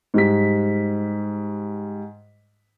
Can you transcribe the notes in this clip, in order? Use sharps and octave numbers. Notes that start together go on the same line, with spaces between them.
G#2 G3 B6